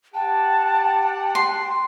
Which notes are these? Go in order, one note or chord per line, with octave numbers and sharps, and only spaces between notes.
G4 F#5 G5 A5
C6